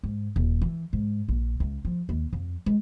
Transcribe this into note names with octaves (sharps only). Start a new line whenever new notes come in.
G#2
D#1
E3
G#2
A#1
C#2
F3
D#2
F2
G#3